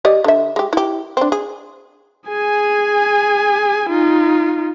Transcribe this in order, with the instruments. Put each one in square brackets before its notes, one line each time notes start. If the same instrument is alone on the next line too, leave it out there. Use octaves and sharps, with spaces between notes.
[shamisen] G4 D5 D#5
D3 E5
G#3 G4
E4 G4
C4 D4
G#4
[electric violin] G#4 G#5
D#4 F4